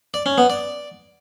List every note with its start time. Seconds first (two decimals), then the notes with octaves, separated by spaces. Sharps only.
0.14 D5
0.26 C#4
0.38 B3
0.50 D5